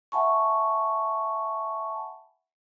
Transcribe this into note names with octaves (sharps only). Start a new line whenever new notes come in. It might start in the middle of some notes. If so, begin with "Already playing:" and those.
E5 F#5 G#5 A5 B5 C#6